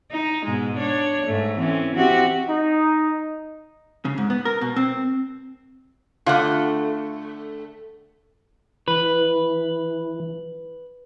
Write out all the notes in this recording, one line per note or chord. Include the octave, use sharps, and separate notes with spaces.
D#4
G#2 B2 G#3
D4 C#5
G#2 A3
E3 C4 C#4
C4 F#4 G4
D#4
C#3
G#2
B3
A#4
B2
C4
D3 A3 F4 F5 F#5
E3 B4